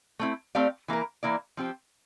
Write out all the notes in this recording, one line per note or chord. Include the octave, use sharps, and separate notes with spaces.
A3 C4 E4
A3 C4 G4 D5 F5
E3 A#3 E4 A#4
E3 A#3 E4 A#4 D5
F3 C4 G4 C5